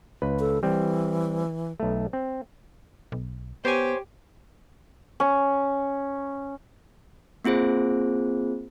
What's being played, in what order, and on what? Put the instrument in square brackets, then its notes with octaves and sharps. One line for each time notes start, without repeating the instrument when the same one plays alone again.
[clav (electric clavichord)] C#2 B4
[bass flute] A4
[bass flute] E3 [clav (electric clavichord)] G3 C4
[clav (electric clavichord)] B1 A3
C4
[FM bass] B1
[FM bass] B3 [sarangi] G4 [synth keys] C5 C#5 G#5
[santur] C#4
[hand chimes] A#3 C4 F4 G#4 C5